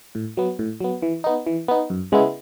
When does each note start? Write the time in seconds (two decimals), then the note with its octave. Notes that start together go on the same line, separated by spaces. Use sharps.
0.15 A2
0.37 F#3 B3
0.59 A2
0.80 F#3 B3
1.02 E3
1.24 B3 D#4
1.47 E3
1.68 B3 D#4
1.90 F#2
2.12 C#3 G#3 B3 E4